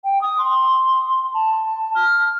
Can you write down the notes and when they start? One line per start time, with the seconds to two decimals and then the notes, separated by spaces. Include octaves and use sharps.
0.04 G5
0.21 D#6
0.38 C6
1.34 A5
1.95 F6